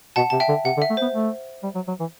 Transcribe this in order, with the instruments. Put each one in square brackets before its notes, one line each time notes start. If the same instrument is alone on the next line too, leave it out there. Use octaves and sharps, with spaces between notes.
[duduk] B2 [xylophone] F#5 A5
[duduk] C3 [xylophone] A5
[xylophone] E5 G5
[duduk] D3
[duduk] C3 [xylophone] F#5
[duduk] D3
[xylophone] E5
[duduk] A3
[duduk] B3 [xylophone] C5
[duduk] A3
G3
F#3
F#3
E3